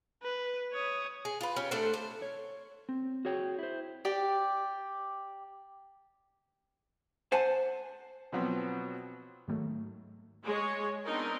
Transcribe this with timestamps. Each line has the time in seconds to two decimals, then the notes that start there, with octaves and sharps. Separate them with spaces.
0.23 B4
0.73 C#5 D#6
1.25 G#4
1.41 F4 B4
1.56 C#4 G4
1.71 A3 D4 A4 C5
1.94 C5
2.22 C#5
2.89 C4
3.25 F#4 G#4 C#5 G5
3.59 E4 C5
4.05 G4 D5 G5
7.32 C5 F#5 G#5 A5
8.32 B2 F3 F#3 B3 C4
9.48 G#2 D#3 F#3 A3
10.44 G#3 C#5
11.05 B3 C4 D4 D#4 A#4